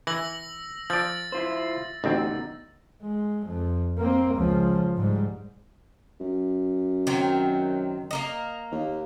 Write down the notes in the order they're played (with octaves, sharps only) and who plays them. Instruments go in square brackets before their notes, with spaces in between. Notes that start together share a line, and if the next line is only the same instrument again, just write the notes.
[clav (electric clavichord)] E3 [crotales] E6 A#6 F#7
[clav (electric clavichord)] F3 D5 [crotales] E6 A6
[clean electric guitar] E4 F4 C5
[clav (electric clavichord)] A1 D2 C4 [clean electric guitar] B2 D#3 D#4
[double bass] G#3
F2
A#3 C4
C#2 F3
G#2 G3
[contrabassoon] F#2
[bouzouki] D#3 F#3 C4
A#3 A#4 D#5
[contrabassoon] D#2